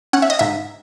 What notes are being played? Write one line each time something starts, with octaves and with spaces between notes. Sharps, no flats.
C#4 F#5
E5
D#5
G#2 E5